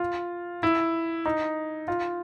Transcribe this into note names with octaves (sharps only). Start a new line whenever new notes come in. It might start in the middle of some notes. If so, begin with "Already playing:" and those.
Already playing: F4
E4
D#4
F4